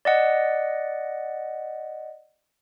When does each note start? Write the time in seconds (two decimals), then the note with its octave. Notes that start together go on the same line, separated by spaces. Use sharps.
0.05 D5 D#5 F#5